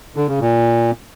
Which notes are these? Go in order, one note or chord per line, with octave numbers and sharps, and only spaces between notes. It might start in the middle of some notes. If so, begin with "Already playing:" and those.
D3
C#3
A#2